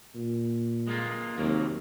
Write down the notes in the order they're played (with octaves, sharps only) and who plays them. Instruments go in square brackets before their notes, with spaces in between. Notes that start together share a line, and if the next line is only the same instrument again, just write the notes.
[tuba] A#2
[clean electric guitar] G#3 A#3 F4
[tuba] D#2 [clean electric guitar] C3 F#3 A#3